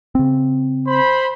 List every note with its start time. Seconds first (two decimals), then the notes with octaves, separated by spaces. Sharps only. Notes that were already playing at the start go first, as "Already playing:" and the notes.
0.15 C#3 C4
0.88 C5 B5